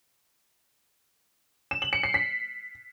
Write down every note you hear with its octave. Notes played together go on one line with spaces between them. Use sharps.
E7
F#7
C#7
C7
B6